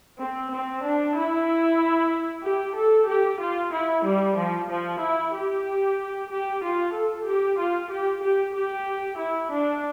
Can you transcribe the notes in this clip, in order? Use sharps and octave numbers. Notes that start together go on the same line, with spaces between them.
C4
C4
D4
E4
G4
A4
G4
F4
E4
G3
F3
F3
E4
G4
G4
F4
A4
G4
F4
G4
G4
G4
E4
D4